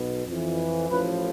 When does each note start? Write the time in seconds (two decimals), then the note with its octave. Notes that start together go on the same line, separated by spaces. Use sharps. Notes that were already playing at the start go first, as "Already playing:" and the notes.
Already playing: B1 B2
0.26 F2 E3
0.89 A1 A2 F3 B4